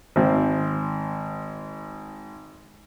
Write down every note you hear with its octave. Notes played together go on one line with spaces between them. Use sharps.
G#1 C4